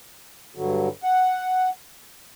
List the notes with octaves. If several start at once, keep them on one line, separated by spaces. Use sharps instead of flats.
G2 D3 F#3
F#5